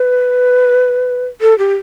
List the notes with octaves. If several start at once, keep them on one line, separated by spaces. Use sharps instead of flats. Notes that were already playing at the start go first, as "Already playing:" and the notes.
Already playing: B4
A4
G4